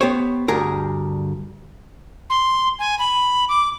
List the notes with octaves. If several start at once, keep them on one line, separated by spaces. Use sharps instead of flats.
B3 G4 C5 C#5
D2 G2 G3 G#4 A#4
C6
G#5
B5
D6